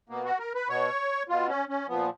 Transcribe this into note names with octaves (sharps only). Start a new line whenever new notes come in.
B2 A#3
F#4
A#4
B4
B2 C#5
B2 F4
C#4
C#4
A#2 F3 B3